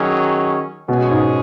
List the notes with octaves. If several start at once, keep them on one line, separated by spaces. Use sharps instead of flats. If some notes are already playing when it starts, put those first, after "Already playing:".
Already playing: D#3 F#3 C#4 G#4
B2 G#3 C#4 G#4
G#2